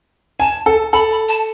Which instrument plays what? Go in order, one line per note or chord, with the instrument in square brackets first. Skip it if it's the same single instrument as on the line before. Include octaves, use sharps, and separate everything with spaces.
[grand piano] G#5 [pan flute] A5
[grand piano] A4
[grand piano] A4 [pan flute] B5
[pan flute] B5
A5